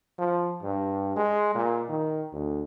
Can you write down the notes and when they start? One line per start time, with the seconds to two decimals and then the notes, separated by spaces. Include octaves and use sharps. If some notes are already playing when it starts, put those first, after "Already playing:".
0.19 F3
0.63 G2
1.17 G#3
1.55 A#2
1.89 D#3
2.33 D2